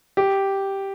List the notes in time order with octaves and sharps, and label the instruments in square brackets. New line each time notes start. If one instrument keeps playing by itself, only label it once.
[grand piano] G4